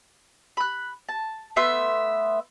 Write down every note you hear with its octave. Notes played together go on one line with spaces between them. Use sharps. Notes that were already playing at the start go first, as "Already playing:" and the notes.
B5 F#6
A5
A3 B3 E5 C6